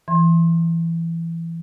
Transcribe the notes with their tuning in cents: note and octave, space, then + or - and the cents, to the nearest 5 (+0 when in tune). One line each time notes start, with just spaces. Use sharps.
E3 +15 C6 +25